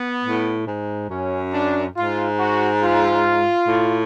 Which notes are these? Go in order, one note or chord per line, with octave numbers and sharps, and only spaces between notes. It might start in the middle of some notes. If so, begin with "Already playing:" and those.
Already playing: B3
A2
G#2
F#2 C#4
D4
G#2 F4
F#4
F4
A2